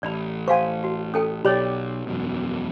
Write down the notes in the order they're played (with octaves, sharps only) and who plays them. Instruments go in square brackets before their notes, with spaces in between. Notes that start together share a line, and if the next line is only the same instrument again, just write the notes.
[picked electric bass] A1 [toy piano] D5 B5
[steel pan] C5 G#5 [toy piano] F5 F#5 C#6
[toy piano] F#4
[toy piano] C#4 A4 G5 [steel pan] D#6
[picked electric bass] B1 [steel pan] G4 D5 [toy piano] C#5 B5
[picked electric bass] E1 F#2 B2